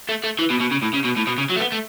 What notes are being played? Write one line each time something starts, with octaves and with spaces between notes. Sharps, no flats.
A3
A3
E3
B2
B2
C#3
A2
C#3
B2
A2
B2
C#3
F#3
A3
B3
A3